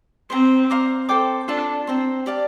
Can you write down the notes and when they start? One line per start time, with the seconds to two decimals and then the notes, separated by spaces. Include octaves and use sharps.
0.30 C4 C5 G5 A#5
0.70 C5 F5 A#5 D6
1.09 A4 C5 G5 D6
1.48 D4 F4 A4 D5 A5
1.87 C4 C5 G5 A#5
2.26 G4 D5 F5 A5